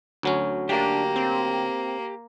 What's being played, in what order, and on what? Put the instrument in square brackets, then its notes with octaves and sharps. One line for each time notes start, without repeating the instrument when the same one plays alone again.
[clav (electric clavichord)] D2 F#3 C#4
[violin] A#3 [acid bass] D4 [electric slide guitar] G4
[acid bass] C4